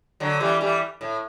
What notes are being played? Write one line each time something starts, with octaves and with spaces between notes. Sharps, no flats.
D3 F#3
E3 G3
E3 G3
A2